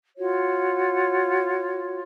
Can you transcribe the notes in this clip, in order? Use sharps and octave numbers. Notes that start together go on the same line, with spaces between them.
F4 F#4 C#5